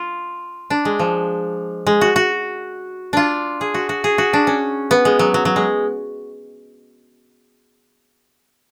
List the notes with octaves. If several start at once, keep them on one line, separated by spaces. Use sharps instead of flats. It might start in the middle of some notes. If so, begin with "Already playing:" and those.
Already playing: F4
D4
G#3
F3
G#3
F#4
F#4
D4 F4
G#4
F#4
F#4
G#4
F#4
D4
C#4
B3
G#3
F#3
F#3
F#3
G#3